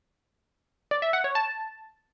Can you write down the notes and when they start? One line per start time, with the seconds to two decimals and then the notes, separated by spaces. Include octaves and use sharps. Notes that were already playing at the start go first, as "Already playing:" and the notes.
0.91 D5
1.02 E5
1.13 F#5
1.24 C#5
1.35 A5